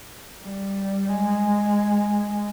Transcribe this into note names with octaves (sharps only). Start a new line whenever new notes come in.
G3
G#3